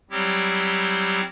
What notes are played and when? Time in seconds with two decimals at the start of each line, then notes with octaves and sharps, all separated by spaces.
0.10 F#3 G3 C4 E4 G4